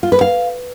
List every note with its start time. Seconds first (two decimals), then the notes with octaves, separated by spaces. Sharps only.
0.03 F4
0.12 B4
0.21 F5